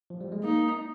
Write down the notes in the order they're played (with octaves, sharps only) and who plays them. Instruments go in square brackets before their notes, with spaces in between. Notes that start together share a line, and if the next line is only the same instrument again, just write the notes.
[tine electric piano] F3
G3
G#3
[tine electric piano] A#3 [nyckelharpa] D#4